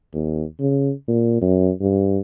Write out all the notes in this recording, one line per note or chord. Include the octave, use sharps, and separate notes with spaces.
D#2
C#3
A#2
F#2
G2